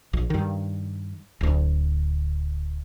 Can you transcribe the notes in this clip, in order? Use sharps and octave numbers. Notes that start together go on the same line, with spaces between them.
A#1
G2 D#3
D1 D2